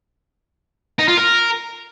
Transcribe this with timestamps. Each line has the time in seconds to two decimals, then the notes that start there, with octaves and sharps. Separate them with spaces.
0.99 D#4
1.08 F4
1.17 A#4